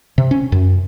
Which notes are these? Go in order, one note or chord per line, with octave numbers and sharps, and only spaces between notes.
C3
C#4
F#2